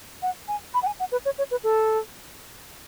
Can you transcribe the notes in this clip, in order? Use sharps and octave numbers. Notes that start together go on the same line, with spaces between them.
F#5
G#5
B5
F#5
G#5
F#5
B4
C#5
C#5
B4
A4